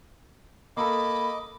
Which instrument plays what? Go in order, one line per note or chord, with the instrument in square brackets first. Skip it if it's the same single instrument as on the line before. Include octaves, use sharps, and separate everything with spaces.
[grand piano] A#3 A4 [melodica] D#5 D6 [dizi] B5